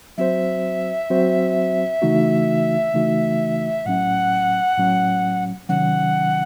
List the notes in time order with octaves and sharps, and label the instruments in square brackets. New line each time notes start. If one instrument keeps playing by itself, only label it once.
[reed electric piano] F#3 C4 F#4 C5 [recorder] E5
[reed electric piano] F#3 C4 F#4 C5
C#3 E3 A3 D#4 F#4
C#3 E3 A3 D#4 F#4
[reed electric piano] A2 F#3 C#4 [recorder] F#5
[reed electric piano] A2 F#3 C#4
[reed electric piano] C3 D#3 F#3 C#4 [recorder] F#5